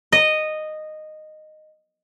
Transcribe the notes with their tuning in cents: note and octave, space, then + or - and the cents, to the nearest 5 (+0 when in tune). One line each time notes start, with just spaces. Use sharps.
D#5 -10